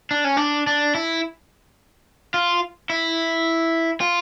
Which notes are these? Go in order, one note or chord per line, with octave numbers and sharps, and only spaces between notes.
D4
C#4
D4
D4
E4
F4
E4
F4